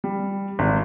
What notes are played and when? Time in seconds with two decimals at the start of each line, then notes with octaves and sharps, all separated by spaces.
0.04 G3
0.59 G#1